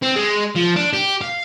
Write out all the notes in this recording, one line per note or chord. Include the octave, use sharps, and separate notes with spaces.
C4
G#3
F3
D4
G4
F5